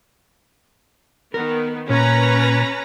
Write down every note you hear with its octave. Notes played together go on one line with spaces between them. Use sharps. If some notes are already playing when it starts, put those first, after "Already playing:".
D#3 B3 A#4
A#2 C#4 B4 A#5